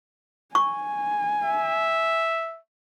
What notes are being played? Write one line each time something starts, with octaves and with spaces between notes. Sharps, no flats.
G#5 C#6
E5